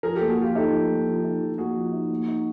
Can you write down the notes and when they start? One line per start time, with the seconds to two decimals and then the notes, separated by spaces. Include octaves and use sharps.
0.03 F3 G#4 A#4
0.16 A#3 G4 A4
0.29 F#4 G#4
0.38 F3 F4 G4
0.55 D#4 G4 A4
0.72 F3
0.89 A#3
1.07 F3
1.24 D#4
1.41 F3
1.58 A#3 F#4 G#4
1.76 F3
1.93 D#4
2.10 A#3
2.27 D#4